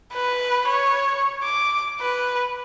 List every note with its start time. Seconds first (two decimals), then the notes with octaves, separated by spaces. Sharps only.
0.13 B4
0.68 C#5
1.43 D6
2.01 B4